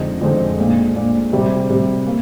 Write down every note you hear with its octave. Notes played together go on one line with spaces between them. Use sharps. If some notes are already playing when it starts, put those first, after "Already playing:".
Already playing: F2 D3 G#3 C4 D#4
F2 D3 G#3 C4 D#4
A#2 G#3 D4
A#2 G#3 D4
C3 G3 C4
C3 G3 C4
A#3